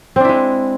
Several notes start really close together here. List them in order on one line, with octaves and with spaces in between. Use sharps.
C4 D4 E4 G#3